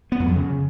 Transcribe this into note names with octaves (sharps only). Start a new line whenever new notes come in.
B3
F#2
F2
C#3